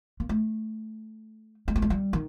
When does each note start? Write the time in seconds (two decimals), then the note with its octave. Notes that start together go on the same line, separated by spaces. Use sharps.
0.20 A#3
0.29 A3
1.68 G#3
1.76 A3
1.82 G#3
1.90 G3
2.13 D#3